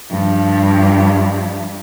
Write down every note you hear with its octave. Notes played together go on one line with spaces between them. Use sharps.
G2 F3